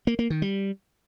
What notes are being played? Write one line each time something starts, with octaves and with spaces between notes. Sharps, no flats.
A#3
A#3
D#3
G3